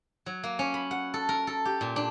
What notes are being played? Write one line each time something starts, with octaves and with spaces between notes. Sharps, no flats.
F#3
A#3
C#4
B5
F#5
A4
A#4
A4
G4
A#2
D4